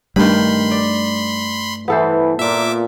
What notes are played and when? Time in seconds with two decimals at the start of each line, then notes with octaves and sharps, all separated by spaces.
0.16 G2 D#3 G3 A3 B5 C6
0.71 D5
1.88 E3 B3 A4 C5
2.39 A#2 E5 D6